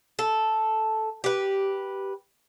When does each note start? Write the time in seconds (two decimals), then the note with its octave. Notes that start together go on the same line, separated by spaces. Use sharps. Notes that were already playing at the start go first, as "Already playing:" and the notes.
0.19 A4
1.24 G4 B4